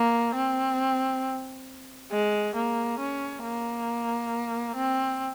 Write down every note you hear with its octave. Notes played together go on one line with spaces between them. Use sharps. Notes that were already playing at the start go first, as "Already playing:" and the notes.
Already playing: A#3
C4
G#3
A#3
C#4
A#3
C4